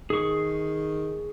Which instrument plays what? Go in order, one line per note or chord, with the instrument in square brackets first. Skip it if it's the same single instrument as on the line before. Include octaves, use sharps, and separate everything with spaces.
[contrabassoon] D#3 [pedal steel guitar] G#4 C#6